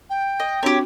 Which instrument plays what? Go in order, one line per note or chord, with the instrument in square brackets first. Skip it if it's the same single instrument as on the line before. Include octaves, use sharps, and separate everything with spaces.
[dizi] G5
[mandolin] D#5
[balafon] C4 D4 F#4 [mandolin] G4 C#5